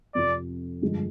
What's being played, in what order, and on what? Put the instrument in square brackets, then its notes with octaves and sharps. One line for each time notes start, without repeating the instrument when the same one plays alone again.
[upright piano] F2 C3 F3 [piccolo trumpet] D5
[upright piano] G2 D3 F3 G#3